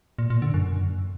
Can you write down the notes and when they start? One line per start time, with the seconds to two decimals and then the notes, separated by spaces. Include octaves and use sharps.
0.19 A#2
0.30 A#2
0.42 D3
0.54 F#2